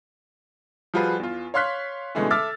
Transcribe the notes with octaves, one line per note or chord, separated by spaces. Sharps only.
F3 G3 F4 F#4 G#4 B4
E2 F4
C#5 F5 C6 F6 F#6 B6
B2 D3 E3 G#3 A3 C#4
A4 E5 D6 E6 F6 A6